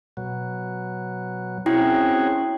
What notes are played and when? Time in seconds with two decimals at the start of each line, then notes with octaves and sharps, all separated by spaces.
0.17 B2 F#3
1.66 C4 C#4 E4 F#4 G#4 G5